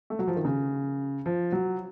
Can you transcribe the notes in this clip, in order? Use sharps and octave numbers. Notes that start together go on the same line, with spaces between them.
A3
F#3
F3
D#3
C#3
F3
F#3